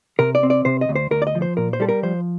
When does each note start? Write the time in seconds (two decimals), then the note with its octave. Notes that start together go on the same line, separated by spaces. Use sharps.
0.19 C3 A#4
0.35 D5
0.43 C4
0.50 D5
0.65 C3 C5
0.81 D#5
0.89 D2
0.95 C5
1.11 D2 A#4
1.22 D5
1.27 D#5
1.35 F3
1.42 C5
1.57 A#2 A#4
1.73 C5
1.80 G3 A4
1.89 A#4
2.03 F3 C5